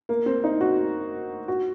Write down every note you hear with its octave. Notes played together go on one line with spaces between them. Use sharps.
A#3
C4
D#4
F#4
F#4